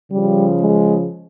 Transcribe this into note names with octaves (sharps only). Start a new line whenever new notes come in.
C#3 F3 G3
G#3